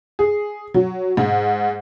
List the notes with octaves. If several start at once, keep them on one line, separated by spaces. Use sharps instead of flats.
G#4
F#3
G#2